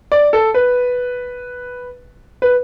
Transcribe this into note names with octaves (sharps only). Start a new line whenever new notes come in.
D5
A4
B4
B4